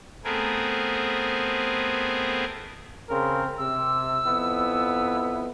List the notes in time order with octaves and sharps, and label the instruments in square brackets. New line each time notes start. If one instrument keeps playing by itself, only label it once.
[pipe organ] A3 B3 C4 G#4 A#4
[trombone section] C#3 C4 A#4
[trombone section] C3 [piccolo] E6
[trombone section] F2 B3 E4